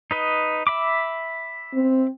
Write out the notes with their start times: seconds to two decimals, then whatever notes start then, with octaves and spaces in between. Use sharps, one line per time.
0.11 D#4 B4 D#5
0.67 E5 B5 D6
1.73 C4